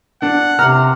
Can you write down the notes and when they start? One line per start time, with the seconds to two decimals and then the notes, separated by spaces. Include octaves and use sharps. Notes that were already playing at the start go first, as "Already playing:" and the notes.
0.22 D4 F#5
0.59 C3 A#5 F6